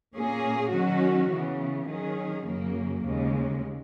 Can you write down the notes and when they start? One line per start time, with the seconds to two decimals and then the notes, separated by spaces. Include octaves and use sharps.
0.14 A#2 A#3 C#4 G#4
0.71 D#3 F#3 C#4 F#4
1.29 C#3 E3 B3
1.88 D#3 F#3 C#4 G#4
2.46 F#2 C#3 F#3 A#3
3.05 D#2 C#3 G#3